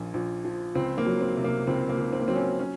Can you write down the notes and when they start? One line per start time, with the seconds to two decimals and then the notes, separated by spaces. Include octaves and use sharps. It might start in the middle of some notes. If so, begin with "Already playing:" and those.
Already playing: A#1 A#2
0.14 A#1
0.45 F3
0.75 C#2 C4
0.98 A#3
1.06 F#3
1.21 C4
1.37 C3
1.44 A#3
1.67 C#2 C4
1.89 A#3
1.97 C#2
2.13 C4
2.20 A#3
2.28 F#3 C4
2.35 C#4
2.59 C#4